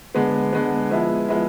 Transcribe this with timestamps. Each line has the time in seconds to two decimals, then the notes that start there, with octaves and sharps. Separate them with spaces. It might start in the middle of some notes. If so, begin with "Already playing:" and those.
0.15 D3 G#3 B3
0.53 D3 G#3 B3
0.90 F3 G#3 B3 E4
1.28 F3 G#3 B3 E4